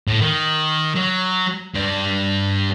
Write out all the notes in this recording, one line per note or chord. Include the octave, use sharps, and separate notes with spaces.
A2
D#3
F#3
G2 D5